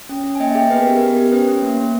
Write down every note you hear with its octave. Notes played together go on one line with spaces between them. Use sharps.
C#4
C#4
G#5
A#3 D#5 G5
E5
G#4 D#5 G5
B3 B4
A#4
G4
B3 A#4
G4
C#4 B4
C#4
A#3
A#3